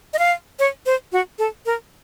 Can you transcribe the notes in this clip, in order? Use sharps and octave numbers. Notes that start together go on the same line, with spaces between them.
D#5
F5
C#5
C5
F#4
A4
A#4